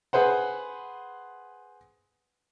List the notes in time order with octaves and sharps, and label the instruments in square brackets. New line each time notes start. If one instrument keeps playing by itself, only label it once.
[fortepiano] G#4 B4 C5 F#5